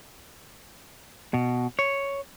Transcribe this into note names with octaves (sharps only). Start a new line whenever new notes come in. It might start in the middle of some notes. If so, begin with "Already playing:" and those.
B2
C#5